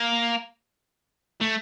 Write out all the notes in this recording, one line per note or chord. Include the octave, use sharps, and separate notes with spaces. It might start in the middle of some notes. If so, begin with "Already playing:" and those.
Already playing: A#3
A3